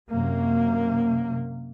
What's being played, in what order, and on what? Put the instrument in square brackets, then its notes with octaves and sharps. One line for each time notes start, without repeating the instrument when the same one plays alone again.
[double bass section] F#2 C3 A#3